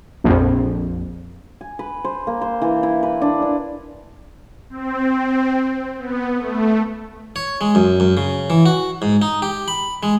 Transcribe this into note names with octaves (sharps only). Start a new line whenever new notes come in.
A#1 F2
G#5
B4
C5
A#3
C5
E3
E4
B4
D4
D4
C4
B3
A3
C#5
G#3
F#2
F#2
C#3
E3
F#4
G#2
D#4
G4
B5
G#3